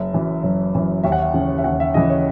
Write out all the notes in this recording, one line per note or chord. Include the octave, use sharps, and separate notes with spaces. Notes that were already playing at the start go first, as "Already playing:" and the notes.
Already playing: F#1 E5
F#2 E3
F#1
F#2 E3
D#2 E5
F#5
E5
C#3 E3
E5
D#2 F#5
E5
C#3 E3 D#5
C#5